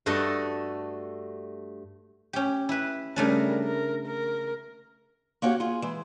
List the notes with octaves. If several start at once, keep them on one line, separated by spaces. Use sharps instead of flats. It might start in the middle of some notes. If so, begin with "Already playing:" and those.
G2 A3 F#4 A4 D#5
C#4 G4
E4 B4
C#3 G3 A3 D4 A#4
A#4
A#4
A#3 C#4 F#4 G4 C#5
F4 G#4
E3 G#3